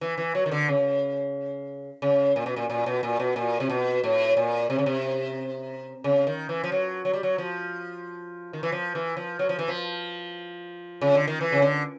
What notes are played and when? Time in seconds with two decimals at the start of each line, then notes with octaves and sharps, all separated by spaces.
0.01 E3
0.18 E3
0.35 F#3
0.46 D#3
0.51 D3
0.68 C#3
2.02 C#3
2.36 A#2
2.46 B2
2.56 A#2
2.70 A#2
2.86 B2
3.03 A#2
3.20 B2
3.36 A#2
3.60 C3
3.70 B2
4.04 A2
4.37 A#2
4.70 C3
4.78 C#3
4.86 C3
6.04 C#3
6.27 D#3
6.49 E3
6.64 F3
6.72 F#3
7.05 F#3
7.13 G3
7.23 F#3
7.38 F3
8.53 D#3
8.63 E3
8.72 F3
8.95 E3
9.17 F3
9.39 F#3
9.49 F3
9.59 E3
9.68 F3
11.01 C#3
11.15 D3
11.27 D#3
11.41 E3
11.52 C#3
11.62 D3